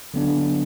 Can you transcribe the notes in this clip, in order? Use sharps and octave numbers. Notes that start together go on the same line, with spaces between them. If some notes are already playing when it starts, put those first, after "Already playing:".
D3 F#3 B3 D4